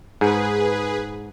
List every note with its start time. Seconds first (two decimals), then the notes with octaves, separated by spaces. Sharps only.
0.21 G#2 G#4 B4